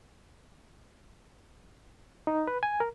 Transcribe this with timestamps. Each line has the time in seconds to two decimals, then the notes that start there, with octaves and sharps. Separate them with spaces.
2.27 D#4
2.47 B4
2.63 G#5
2.80 A#4